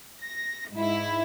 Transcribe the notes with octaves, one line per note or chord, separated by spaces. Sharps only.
A#6
G#2 E4